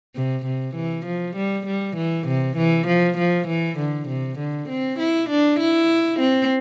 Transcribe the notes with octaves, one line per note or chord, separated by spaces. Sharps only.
C3
C3
E3
F3
G3
G3
E3
C3
E3
F3
F3
E3
D3
C3
D3
C4
E4
D4
E4
C4